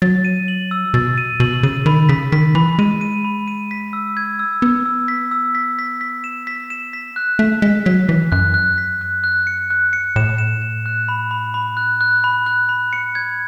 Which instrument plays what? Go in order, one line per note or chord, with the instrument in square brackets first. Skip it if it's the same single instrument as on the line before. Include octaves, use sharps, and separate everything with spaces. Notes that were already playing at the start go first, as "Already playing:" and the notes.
[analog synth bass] F#3 [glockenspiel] A6
[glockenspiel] D#7
F#7
E6
[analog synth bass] B2 [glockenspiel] A6
[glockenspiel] D#7
[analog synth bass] B2 [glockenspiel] F#7
[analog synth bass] C#3 [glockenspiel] D#7
[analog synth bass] D#3 [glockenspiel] B5
[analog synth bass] C#3 [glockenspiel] B6
[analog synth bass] D#3 [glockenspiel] B6
[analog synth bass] E3 [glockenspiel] B5
[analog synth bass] G#3 [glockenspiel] D#7
[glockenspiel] D#7
B5
D#7
B6
E6
G#6
E6
[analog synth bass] B3 [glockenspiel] E6
[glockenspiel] E6
B6
E6
B6
B6
B6
E7
B6
E7
B6
F#6
[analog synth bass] A3 [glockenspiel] B6
[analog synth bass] G#3 [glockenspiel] B6
[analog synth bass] F#3 [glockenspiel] B6
[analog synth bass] E3 [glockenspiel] B6
[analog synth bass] F#2 [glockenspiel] F#6
[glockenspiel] F#6
B6
F#6
F#6
C#7
F#6
C#7
[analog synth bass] A2 [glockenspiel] E7
[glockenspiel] E7
E7
F#6
B5
B5
B5
F#6
F#6
B5
F#6
B5
C#7
G#6